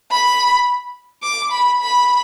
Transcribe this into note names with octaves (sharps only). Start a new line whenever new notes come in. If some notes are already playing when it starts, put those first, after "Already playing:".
B5
D6
B5
B5